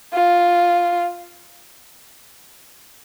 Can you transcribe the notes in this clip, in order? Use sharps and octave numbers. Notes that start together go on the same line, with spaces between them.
F4